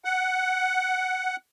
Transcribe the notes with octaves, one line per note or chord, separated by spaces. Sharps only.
F#5